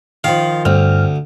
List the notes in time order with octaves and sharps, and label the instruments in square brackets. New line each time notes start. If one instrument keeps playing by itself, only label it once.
[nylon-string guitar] D#3 F3 [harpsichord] F5
[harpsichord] D2 [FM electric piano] G2 F6 [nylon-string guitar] C4